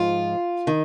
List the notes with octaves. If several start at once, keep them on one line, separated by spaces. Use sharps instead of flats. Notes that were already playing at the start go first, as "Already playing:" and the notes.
Already playing: G#2 F3 F4
D#3